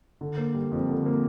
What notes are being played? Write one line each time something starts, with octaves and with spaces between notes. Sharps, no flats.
D3
A#3
G3
F2
D3
A#3